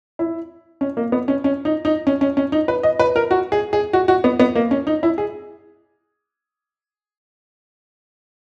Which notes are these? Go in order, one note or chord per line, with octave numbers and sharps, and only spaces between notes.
E4
C#4
A#3
B3
C#4
C#4
D#4
D#4
C#4
C#4
C#4
D#4
B4
D#5
B4
A#4
F#4
G#4
G#4
F#4
F#4
B3
B3
A#3
C#4
D#4
E4
G#4